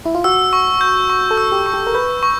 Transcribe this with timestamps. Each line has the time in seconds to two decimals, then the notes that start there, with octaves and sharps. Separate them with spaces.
0.05 E4
0.15 F4
0.24 F#4 E6
0.53 C#6
0.81 G6
1.10 C#6
1.31 A4
1.37 E6
1.52 G4
1.66 C#6
1.74 G4
1.87 A#4
1.95 B4 G6
2.23 C#6